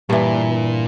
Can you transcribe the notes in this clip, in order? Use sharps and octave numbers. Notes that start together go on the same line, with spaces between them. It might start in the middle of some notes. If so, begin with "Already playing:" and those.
G2 A#2 E3